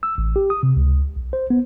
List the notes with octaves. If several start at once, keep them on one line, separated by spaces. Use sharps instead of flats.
E6
A1
G4
D#6
C3
C#2
B1
C5
B3